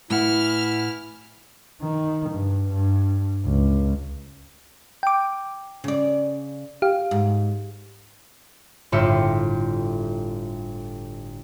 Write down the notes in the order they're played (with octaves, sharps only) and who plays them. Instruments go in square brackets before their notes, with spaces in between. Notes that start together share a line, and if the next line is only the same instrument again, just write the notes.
[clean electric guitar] A2 A3 F#5 [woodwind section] E3 E4 [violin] F6
[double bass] D#3
G2
G2
C#2
[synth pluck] G5 D6
[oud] C#3 D5
[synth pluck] G4 F5
[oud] G#2
[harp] G1 A2 F4 G4 E5 C#7